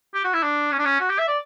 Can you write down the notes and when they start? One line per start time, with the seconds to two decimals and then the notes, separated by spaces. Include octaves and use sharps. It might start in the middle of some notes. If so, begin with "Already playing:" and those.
0.14 G4
0.24 F#4
0.34 E4
0.43 D4
0.71 C#4
0.79 D4
0.85 C#4
1.00 F#4
1.10 G4
1.19 E5
1.28 D5